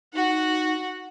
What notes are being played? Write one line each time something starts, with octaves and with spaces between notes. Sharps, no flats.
D#4 F#4 F#5